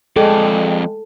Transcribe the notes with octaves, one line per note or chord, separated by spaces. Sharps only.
F2 G#3 G#4 A4 D5 D#5 G5